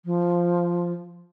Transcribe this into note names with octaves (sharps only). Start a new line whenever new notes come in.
F3